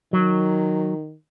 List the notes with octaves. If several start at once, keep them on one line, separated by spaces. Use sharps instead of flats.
D#3 F#3